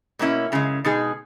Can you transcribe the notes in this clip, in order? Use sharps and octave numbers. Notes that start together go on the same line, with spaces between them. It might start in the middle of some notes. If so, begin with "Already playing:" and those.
B2 A#3 C#4 E4
F#2 C#3 G#3
B2 G#3 D#4 G#4